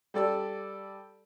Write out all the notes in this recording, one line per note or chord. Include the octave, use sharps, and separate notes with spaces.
G3 A4 D5 E6